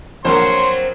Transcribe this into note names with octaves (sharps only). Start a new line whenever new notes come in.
A#1 F#3 A#3 C4 A#4 C5 C#5 C6